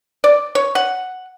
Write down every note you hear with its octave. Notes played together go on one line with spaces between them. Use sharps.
D5
C#5
F#5